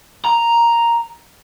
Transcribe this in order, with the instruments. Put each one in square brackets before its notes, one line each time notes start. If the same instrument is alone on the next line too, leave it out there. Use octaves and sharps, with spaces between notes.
[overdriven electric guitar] A#5